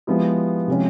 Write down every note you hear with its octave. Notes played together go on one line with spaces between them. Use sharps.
F3 G#3 B3 E4 G4
C3 F3 G#3 C#4